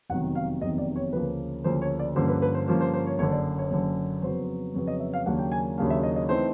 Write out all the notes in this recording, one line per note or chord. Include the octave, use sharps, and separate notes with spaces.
F1 E2 C3 D#3 F#3 F#5
F5
F1 E2 C3 D#3 F#3 D#5
D5
C#5
D2 C#3 F3 A#3 B4
D2 C#3 F3 A#3 C5
C#5
D5
G2 D3 F3 A#3 C#4 C5
B4
B4
C5
G2 D3 F3 A#3 C#4 C5
C5
C5
C#5
F#1 F#2 D3 C#5
D5
C#5
F#1 F#2 D3
F2 C#3 F#3 B3 C5
F2 C#3 F#3 B3 C#5
D#5
E5
F5
D#2 C#3 F#3 A#3 D4 F#5
G5
G#5
D#2 C#3 F#3 A#3 D4 F5
E5
D#5
D#5
E3 A3 C4 D#4 C5